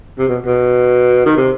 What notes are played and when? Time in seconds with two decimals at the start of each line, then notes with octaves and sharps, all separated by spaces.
0.18 C3
0.28 B2
0.46 B2
1.26 D#3
1.37 C3